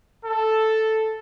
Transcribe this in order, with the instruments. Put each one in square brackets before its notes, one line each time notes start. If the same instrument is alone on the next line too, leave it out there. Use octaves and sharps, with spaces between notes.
[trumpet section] A4